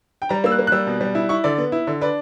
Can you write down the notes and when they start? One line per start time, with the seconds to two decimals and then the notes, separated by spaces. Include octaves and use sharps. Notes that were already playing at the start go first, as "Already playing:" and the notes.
0.22 G5
0.29 G3 A#5
0.44 A#3 E6
0.52 F#6
0.59 A#3
0.67 F#6
0.72 G3 E6
0.87 B2
1.01 G3
1.15 E4
1.29 E4 C#6
1.44 D3 D5
1.58 B3
1.72 E4
1.87 D3
2.01 D4 B4